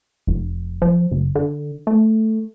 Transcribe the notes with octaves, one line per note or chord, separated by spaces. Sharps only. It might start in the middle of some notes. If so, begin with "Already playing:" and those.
F1
F3
F#1
D3
A3